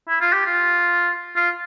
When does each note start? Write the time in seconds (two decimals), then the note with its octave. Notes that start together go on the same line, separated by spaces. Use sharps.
0.09 E4
0.21 F4
0.33 G4
0.46 F4
1.36 F4